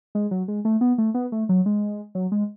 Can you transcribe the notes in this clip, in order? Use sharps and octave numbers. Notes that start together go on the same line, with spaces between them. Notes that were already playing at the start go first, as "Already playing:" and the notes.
G#3
F#3
G#3
A3
B3
A3
B3
A3
F#3
G#3
F#3
G#3